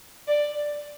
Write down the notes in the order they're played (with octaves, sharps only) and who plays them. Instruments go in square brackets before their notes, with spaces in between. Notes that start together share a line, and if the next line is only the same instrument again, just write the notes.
[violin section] D5